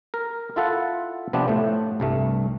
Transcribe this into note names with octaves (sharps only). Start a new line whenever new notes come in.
A#4
E4 F4 A4 E5 F#5
C3 F3 B3 C4 D4
A2 A3
C2 G2 A3